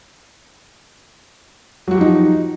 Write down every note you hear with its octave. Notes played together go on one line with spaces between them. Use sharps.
F3 F#3 D#4 F#4 G4